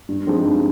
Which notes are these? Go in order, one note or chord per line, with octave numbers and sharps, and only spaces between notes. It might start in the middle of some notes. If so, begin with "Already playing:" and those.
G2
F3 G#3 C4 D#4
G2